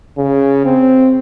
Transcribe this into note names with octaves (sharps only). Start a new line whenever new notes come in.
C#3
C4